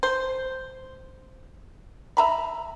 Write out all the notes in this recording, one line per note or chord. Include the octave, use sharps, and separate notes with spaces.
C5
E5 A#5 B5